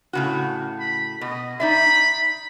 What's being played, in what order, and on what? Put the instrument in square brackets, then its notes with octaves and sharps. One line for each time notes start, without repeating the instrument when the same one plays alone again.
[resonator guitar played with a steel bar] A2 C#3 F#4
[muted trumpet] B5
[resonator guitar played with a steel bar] B2 [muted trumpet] D#5
[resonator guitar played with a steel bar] D#4 D5 E5 [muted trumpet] B5